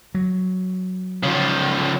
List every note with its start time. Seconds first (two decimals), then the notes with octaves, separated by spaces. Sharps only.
0.15 F#3
1.23 C#3 F3